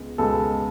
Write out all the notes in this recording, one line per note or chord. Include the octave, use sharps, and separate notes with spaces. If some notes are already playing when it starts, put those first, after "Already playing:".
Already playing: C#2 G#3 B3
C#2 B2 G#3 B3 A4